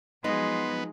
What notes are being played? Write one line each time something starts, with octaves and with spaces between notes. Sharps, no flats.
F3 F#3 G#3 B3 D#4 D#5 C6